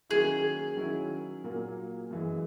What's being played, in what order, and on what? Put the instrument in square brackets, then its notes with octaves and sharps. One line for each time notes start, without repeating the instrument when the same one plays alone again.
[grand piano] D#3 F#3 A#3 C#4 E4 [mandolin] G#4
[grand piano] D#3 F#3 C#4 E4
A#2 F#3 A#3
F#2 E3 G#3